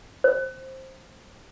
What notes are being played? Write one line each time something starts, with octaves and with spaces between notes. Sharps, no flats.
C5